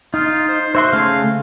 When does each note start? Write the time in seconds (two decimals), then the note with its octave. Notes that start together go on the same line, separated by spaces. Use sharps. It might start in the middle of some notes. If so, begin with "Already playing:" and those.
0.14 D#4 F4
0.49 C5
0.75 F#4 C5 E5 C6
0.92 C#3 A3 F5 G#5